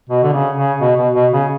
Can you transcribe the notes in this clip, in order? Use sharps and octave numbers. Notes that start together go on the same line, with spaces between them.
B2
D3
C#3
C#3
B2
B2
B2
C#3